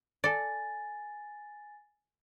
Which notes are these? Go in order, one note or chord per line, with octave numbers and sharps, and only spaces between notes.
A4 D5 G#5 A6